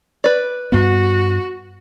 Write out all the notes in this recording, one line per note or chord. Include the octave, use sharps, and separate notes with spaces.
B4 D5
G2 B3 F#4